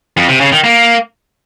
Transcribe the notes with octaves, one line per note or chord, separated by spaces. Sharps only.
F2
C3
C#3
D#3
A#3